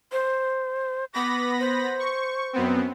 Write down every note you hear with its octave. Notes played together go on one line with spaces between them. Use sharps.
C5
B3 B5 D6 A#6
C5
C#6
F#2 B3 C4